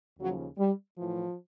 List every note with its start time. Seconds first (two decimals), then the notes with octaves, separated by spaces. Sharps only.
0.19 D#2 C#3 F3 F#3
0.58 G3
0.98 A2 E3 F3